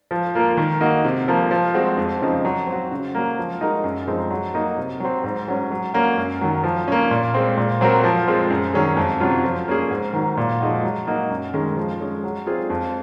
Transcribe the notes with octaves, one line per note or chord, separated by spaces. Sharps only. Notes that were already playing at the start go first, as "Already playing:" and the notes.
F3
A#3 F4 A#4
D#3
A#3 D#4 F#4
C3
F3 A#3
F3
G#3 C4 F#4
F2
C#3 F3 C4 D#4
F#3
C4
F#4
C#3
F#3 A#3
F3
G#3 D#4 F#4 A#4
F#2
F3 G#3 C4 D#4
F#3
A#3 D#4 F#4
C3
F#3 C4
G#2
F#3 C#4
F#3
A#3 C#4 F#4
F#2
D#3 F#3
F3
A#3 C#4
A#2
G#3 C4
A#2
F#3 C4 F#4 A#4
F3
G#3 C4 F4
F#2
D#3 F#3 C#4 G#4
F2
C3 F#3 C#4 F4
F3
A#3 C#4 G#4
G#2
D#3 F#3
A#2
F3 G#3 D#4 F#4
F#3
A#3 D#4 F#4
F#2
D#3 G#3 C#4
F3
G#3 C#4
F#3
C4 F4 G#4
F2